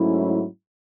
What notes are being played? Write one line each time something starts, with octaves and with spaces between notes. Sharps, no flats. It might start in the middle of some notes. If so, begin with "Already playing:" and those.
Already playing: G#2 F#3 A3 C#4 E4